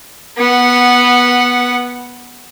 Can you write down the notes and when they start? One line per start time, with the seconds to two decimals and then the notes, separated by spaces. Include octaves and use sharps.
0.38 B3 F#5